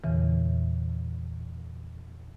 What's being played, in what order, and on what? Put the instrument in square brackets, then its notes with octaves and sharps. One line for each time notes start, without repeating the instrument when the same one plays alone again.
[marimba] E2 A#2 C#3 E3